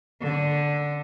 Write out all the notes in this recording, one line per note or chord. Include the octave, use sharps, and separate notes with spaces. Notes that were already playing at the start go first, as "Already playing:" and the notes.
D3